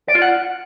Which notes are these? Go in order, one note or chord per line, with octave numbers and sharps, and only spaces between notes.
D5
F4
F#5